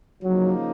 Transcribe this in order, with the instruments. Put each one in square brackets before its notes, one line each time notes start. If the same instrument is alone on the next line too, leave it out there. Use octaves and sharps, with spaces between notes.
[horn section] C#3 F3 A#3 D#4 [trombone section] F#3